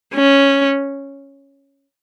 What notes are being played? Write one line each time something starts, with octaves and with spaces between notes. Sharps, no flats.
C#4